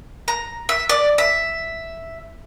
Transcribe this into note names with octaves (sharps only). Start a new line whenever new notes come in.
A#5
E5
D5
E5